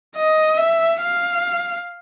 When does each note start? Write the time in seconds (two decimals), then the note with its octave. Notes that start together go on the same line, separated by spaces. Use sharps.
0.16 D#5
0.57 E5
1.01 F5